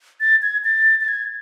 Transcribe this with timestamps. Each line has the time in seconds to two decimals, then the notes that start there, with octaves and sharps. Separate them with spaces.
0.20 A6
0.42 G#6
0.64 A6
1.01 A6
1.08 G#6